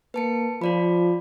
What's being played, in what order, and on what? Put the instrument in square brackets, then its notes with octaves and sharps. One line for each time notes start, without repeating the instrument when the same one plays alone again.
[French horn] A#3 [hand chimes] B4 A5 C#7
[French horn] F3 [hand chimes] F4 D5 B5